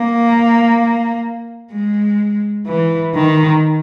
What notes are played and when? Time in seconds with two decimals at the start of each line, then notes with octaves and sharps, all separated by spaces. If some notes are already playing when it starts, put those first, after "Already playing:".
Already playing: A#3
1.73 G#3
2.67 E3
3.15 D#3